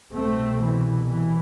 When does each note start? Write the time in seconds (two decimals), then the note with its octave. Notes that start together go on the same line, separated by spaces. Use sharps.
0.13 C2 B2 A3 C4
0.60 E3
1.10 E3